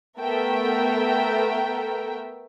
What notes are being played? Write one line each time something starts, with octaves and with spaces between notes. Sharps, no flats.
A3 B3 A#4 E5 G5